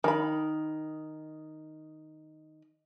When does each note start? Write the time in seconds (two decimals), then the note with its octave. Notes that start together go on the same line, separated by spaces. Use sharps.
0.04 D#3 B5